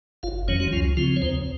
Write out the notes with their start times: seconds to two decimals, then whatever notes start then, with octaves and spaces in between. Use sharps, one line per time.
0.23 F#1 F4 F5
0.48 F2 D#3 F#3 C#4 C#5
0.60 F#3 F#4
0.72 C#2 F3 F4
0.97 C#3 F3 C4 F4
1.16 C#5
1.22 D#2 C4 C5